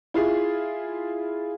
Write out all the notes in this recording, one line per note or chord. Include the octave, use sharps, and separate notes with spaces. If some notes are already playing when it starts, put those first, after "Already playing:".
E4 F4 G#4